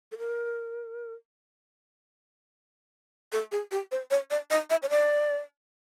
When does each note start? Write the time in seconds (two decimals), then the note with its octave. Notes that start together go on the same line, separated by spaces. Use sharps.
0.12 A4
0.18 A#4
3.32 A4
3.52 G#4
3.71 G4
3.92 C5
4.11 C#5
4.31 D5
4.50 D#5
4.70 E5
4.83 C#5
4.90 D5